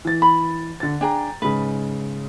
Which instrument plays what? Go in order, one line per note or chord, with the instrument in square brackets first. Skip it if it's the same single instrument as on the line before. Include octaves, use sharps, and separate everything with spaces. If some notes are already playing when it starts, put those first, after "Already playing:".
[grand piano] E3 A6
[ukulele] B5
[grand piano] D3 A6
[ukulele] D4 G#4 [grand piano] G5 A#5
[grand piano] G#2 C#3 [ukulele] B4